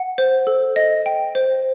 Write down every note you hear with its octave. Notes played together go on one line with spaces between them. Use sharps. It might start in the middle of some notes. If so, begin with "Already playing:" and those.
Already playing: F#5
C5
A4
D#5
G5
C5